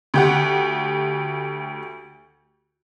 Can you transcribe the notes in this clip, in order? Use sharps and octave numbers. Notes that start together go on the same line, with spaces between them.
D2 G4 F#5